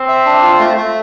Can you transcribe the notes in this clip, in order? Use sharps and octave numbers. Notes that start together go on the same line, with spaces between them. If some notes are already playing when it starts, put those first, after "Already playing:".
Already playing: C4
E5
D4
F4
A3
A3